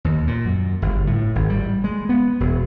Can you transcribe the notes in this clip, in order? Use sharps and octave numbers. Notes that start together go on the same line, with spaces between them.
D#2
A#2
F#2
G1
A2
G#1
G3
G#3
B3
E1